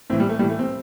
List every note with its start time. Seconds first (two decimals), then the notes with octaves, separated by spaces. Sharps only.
0.10 A2 C4
0.13 E3
0.20 G3
0.29 A3
0.39 A2 E3 G3
0.49 A3
0.59 C4